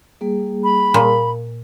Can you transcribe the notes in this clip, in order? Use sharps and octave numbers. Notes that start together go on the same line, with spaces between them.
G3 A#3 G#4
B5
A#2